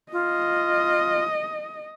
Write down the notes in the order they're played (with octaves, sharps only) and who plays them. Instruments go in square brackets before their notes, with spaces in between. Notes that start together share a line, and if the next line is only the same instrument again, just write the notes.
[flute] F4 [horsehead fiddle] D#5